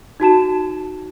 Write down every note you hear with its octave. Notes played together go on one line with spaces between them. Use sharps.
D#4 F#4 A5 E7